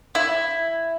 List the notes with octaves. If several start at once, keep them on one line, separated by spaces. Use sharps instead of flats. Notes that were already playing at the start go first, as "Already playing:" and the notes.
E4